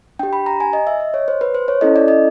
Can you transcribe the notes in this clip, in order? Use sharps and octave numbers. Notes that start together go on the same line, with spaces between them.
D4 G4 G5
B5
A#5
G#5
D#5
E5
D#5
C#5
C5
B4
C5
C#5
C#4 E4 A4 D#5
D5
D#5